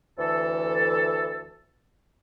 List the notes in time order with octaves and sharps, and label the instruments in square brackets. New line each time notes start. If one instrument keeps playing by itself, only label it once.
[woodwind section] D2 E3 A4